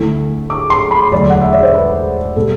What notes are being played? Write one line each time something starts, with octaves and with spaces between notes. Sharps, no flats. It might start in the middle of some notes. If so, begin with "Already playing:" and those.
Already playing: D2 D3 A3 E4
D6
C6
B5
E1 D2 D3 F#3 D5
F#5
E5
D5
C5
B4
B2 G3 A4